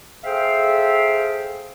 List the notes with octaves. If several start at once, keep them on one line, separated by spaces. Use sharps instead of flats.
G#4 A4 C5 E5 F5 G5